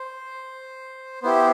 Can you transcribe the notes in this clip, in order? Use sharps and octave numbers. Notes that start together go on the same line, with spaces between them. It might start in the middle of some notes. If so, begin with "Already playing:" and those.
Already playing: C5
B3 E4 G4 C5